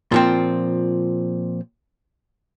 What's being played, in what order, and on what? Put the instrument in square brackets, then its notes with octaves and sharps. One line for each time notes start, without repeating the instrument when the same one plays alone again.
[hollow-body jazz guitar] A#2 F3 C4